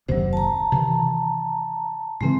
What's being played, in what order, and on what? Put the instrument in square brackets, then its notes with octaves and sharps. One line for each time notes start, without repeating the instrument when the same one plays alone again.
[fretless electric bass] F#1 D#2 C3 [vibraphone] F#3 C5
[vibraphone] A5 A#5
[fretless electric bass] C3 D#3 E3
[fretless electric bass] A2 C#3 E3 [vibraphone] G#3 C4